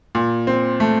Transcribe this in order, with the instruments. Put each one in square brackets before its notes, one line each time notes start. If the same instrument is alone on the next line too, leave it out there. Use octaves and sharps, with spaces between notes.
[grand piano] A#2
C4
A3